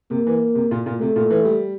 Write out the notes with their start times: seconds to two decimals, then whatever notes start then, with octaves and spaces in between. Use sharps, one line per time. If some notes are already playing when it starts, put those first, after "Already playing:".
0.11 C3 A#3
0.27 E3
0.55 C3
0.71 A#2
0.86 A#2
1.00 C3 A3
1.16 A#2
1.30 E3
1.45 G3